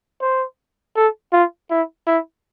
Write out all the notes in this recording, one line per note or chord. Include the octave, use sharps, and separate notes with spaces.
C5
A4
F4
E4
E4